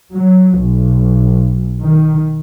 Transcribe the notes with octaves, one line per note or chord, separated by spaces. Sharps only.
F#3
B1
D#3